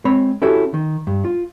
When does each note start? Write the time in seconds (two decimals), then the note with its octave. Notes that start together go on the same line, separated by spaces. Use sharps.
0.05 G#3 C4 C#5 B5
0.42 C#4 E4 F#4 G4 A4 C#5
0.74 D#3
1.07 G2
1.25 F4